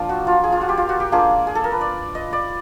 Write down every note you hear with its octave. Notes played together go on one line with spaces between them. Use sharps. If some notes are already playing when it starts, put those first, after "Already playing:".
Already playing: F3 A#3 D4 F4
F#4
F4
G#4
F4
F#4
G4
F4
F#4
G4
A#3 D4 F4 G#4
G#4
A4
A#4
B4
D5
D#5
D5